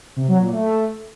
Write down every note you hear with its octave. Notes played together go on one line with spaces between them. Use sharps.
C3
F#3
A#2
A3